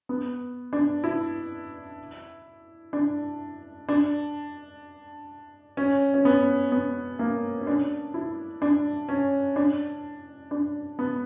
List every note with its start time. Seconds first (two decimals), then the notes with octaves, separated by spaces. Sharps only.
0.09 B3
0.73 D4
1.04 E4
2.93 D4
3.89 D4
5.77 C#4
6.14 C#4
6.25 B3
6.72 B3
7.19 A#3
7.61 C#4
7.67 D4
8.14 E4
8.62 D4
9.09 C#4
9.56 D4
10.51 D4
10.99 B3